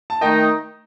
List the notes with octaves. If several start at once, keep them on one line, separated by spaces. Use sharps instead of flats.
A5
D#3 A3 D#4 D#5 G5